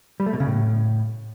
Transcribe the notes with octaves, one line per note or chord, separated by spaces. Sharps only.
G3
A3
B2
C#3
A2